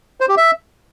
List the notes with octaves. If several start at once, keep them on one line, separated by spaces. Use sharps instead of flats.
C5
G4
E5